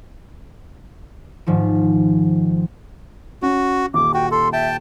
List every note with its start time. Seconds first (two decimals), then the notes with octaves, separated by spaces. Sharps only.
1.47 G#2 D#3 F3
3.42 C#4 F#4
3.94 D#1 D6
4.14 F#4 G5
4.31 A4 C6
4.53 E5 G5 A5